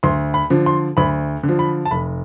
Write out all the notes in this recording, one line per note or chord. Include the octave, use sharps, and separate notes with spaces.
D2 C6
B5
D3 F3
C6
D2 B5
D3
F3
B5
A5
F1 B5